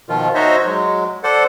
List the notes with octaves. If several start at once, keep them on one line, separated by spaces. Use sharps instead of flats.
B2 D#3 F3 F4
D#4 F#4 C5 C#5 D#5 E5
F#3 G#3
A4 C5 D5 F#5